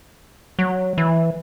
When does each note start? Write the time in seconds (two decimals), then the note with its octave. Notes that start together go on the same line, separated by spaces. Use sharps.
0.59 F#3
0.98 E3